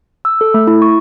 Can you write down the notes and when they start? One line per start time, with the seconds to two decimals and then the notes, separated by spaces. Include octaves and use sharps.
0.25 E6
0.41 A4
0.54 A3
0.67 E4
0.82 C#6